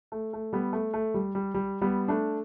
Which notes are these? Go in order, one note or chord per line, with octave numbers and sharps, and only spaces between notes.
A3
A3
G3 B3
A3
A3
G3
G3
G3
G3 B3
A3 D4